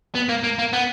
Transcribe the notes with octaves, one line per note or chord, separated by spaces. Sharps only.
B3
A#3
A#3
A#3
B3